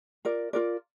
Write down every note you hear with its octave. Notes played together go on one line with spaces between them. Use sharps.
F4 A#4 D5
F4 A#4 D5